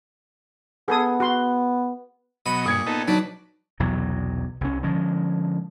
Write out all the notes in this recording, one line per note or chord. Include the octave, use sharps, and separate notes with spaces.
B3 G#4 A4 D#6
F#4 C6
B2 F#3 D#5 B5
G2 A#2 D#6 G#6 C#7
B3 D#4 A4
F#3 D4 D#4 B4 A5
B1 E2 C3 F#3
C2 C#4
D3 F3 G#3 C#4